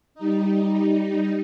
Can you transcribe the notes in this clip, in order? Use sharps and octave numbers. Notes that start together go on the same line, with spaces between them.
G3 D#4